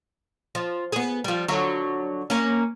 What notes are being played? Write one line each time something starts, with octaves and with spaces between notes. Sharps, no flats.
F3
B3 G#4
F3 G3
D3 F#3
A#3 C#4